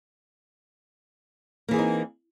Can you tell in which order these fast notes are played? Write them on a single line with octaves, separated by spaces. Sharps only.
A#3 E3 G#4 C4 D#4